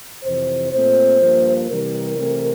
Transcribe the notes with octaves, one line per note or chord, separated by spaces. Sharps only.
F2 C3 E3 C5
A#2 A3 C4 C5
G2 F3 A#3
C3 E3 G3 A#4
C3 E3 A3 C4